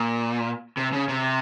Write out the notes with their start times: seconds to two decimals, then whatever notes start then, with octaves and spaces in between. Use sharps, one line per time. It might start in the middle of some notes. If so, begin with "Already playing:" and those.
Already playing: A#2
0.77 C3
0.93 C#3
1.09 C3